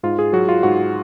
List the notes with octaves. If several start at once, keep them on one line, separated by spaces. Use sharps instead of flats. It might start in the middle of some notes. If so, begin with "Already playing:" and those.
G#2 F4
G#4
F#3 F#4
F4
G#2 F#4